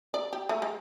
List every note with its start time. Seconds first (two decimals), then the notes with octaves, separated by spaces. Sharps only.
0.14 D5
0.33 G4
0.49 A3
0.62 G#3